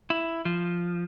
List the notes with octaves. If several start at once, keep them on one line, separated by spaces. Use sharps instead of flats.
E4
F3